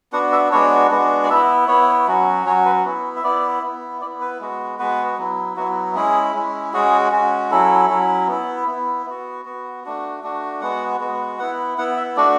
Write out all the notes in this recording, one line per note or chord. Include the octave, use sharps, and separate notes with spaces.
B3 D4 F#4 F#5
E5
G#3 B3 D4 F#4 C#5
G#3 B3 D4 F#4
D5
B3 E4 E5
B3 E4 C#5
F#3 C#4 F#4
F#3 C#4 F#4 C#5
B4
B3 E4
E5
B3 E4 D5
B3 E4
B3 E4 D5
B4
G#3 B3 F#4
G#3 B3 F#4 B4
F#3 B3 E4
F#3 B3 E4 F#4
G#3 C#4 E4 G#4
G#3 C#4 E4
G#3 C#4 F#4 G#4
G#3 C#4 F#4
F#3 C#4 E4 A4
F#3 C#4 E4
B3 E4
B3 E4
B3 F#4
B3 F#4
A3 D4 F#4
A3 D4 F#4
G#3 B3 F#4 F#5
G#3 B3 F#4
B3 E4 F#5
B3 E4 F#5
E5
A3 D4 F#4 D5